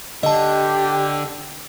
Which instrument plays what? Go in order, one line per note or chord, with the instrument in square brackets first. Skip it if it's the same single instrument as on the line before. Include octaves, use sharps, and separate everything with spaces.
[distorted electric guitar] D3 [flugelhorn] G4 [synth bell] D#5 A5